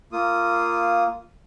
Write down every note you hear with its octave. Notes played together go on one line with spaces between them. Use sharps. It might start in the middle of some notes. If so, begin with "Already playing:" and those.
A#3 F4 D#6